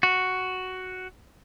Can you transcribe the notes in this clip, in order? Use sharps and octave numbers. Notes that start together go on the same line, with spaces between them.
F#4